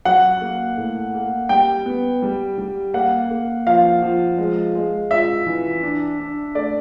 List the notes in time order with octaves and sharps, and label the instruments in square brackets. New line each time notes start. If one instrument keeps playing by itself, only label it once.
[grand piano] F#3 [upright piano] F#5
[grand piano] A#3
A2
A#3
[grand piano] G3 [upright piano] G5
[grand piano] B3
G3
G3
[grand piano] A#3 [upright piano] F#5
[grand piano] A#3
[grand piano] F3 [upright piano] F5
[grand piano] F3
G#3
G#3
[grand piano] F4 [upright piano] E5
[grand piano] E3
D4
D4
[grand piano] A3 [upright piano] D5